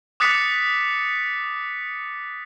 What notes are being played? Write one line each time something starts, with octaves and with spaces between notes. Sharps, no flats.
D6 D#6 F#6 A6 B6 C#7